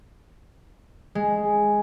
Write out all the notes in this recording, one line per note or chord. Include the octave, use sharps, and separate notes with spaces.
G#3